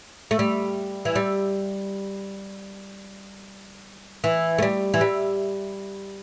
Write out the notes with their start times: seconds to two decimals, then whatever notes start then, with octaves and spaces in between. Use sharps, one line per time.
0.31 A3
0.39 G3
1.05 E3
1.16 G3
4.24 E3
4.58 A3
4.62 G3
4.94 E3
5.01 G3